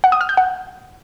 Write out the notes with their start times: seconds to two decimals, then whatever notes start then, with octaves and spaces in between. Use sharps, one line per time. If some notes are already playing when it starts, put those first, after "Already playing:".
0.04 F#5
0.12 D#6
0.21 F6
0.29 G6
0.37 F#5